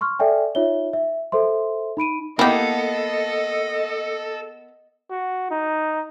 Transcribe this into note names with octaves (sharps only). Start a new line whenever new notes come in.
C6 C#6 F6
A4 D5 E5 G5 G#5
D#4 F4 C#5 E5 G7
E5
A4 C5 E5 C6
D#4 B5 D7 D#7
A#3 B3 E4 G4 A4 D#5
F#4
D#4